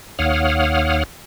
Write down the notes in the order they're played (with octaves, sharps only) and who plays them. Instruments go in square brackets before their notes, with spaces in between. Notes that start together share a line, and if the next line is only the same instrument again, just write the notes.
[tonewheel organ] D#2 C#5 F5 F#5 D#6 F6